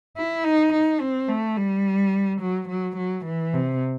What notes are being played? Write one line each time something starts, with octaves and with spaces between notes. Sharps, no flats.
E4
D#4
D#4
C4
A3
G3
F#3
F#3
F#3
E3
C3